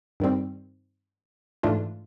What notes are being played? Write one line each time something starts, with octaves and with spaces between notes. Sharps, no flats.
G2 D#3 G3 C4
G#2 E3 A3 D4 F4